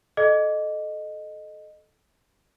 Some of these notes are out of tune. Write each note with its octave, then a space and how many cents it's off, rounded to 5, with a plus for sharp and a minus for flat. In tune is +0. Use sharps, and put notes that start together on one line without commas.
A4 -20 D#5 -15